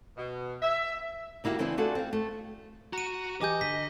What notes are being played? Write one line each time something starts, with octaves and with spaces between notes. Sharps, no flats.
B2
E5
D3 A#3 E4 F#4 G4
C#3 E3 C4 D4 E4 B4
A3 D4 F4 F#4 G#4 A4
C4 F5
A3
F#4 A#5 D#7
E3 G4 D#5 G#5 D6 G6
D3 B6